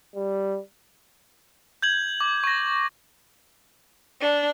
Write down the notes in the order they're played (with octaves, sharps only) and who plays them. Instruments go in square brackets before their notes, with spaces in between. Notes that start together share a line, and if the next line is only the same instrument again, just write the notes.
[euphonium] G3
[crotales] G6 G#6 F#7
D6
C#6 A#6
[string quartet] D4